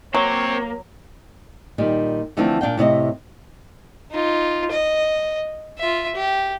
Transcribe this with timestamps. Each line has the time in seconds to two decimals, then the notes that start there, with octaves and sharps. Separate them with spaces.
0.14 F#3 A#3 C4 C#5
1.78 A#2 D#3 G3
2.37 D3 E3 F3 A3 C4 D4
2.61 A#2 D4 F5 G5
2.77 A2 C3 D5 D#5
4.12 D#4 F4
4.71 D#5
5.78 F4 E5
6.15 G4